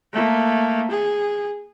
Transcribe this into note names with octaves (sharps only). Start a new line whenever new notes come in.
A3 A#3
G#4